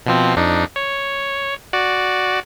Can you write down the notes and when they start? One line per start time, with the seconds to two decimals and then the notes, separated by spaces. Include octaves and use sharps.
0.06 B2 F3 C4
0.36 F2 D4 D#4
0.76 C#5
1.73 F#4 D5